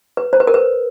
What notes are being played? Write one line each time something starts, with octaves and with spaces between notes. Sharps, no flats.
B4
C5
B4
A#4
B4